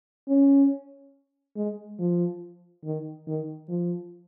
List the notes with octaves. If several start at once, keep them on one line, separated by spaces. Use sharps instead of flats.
C#4
G#3
F3
D#3
D#3
F3